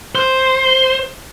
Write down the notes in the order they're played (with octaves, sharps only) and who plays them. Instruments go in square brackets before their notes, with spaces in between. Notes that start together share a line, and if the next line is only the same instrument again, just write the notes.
[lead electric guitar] C5